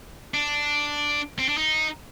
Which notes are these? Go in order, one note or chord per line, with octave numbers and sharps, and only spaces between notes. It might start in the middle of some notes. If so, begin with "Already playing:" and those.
D4
C4
D4
D#4